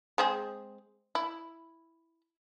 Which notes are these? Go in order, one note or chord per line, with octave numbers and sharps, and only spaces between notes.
G#3 C4 G#4
E4